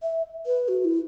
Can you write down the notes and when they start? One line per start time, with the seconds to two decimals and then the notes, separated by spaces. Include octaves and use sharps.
0.02 E5
0.46 B4
0.68 F#4
0.85 E4